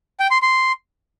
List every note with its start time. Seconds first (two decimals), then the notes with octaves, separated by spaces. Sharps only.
0.20 G5
0.31 C6
0.42 C6